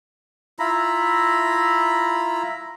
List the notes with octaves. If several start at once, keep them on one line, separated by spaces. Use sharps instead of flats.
E4 F4 A#5 B5